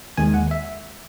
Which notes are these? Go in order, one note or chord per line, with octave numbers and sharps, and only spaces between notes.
D#2 D#3 G#3 G#5
F#5
E5